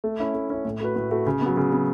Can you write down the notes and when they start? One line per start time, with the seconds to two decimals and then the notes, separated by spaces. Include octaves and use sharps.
0.04 A3
0.20 C#4 E4
0.34 A3
0.50 C#4 E4
0.65 A2
0.80 A3 F#4 B4
0.96 A2
1.11 A3 F#4 B4
1.26 C#3
1.41 F#3 B3
1.57 C#3
1.72 F#3 B3